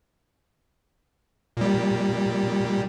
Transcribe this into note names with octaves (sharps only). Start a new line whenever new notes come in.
A#2 G3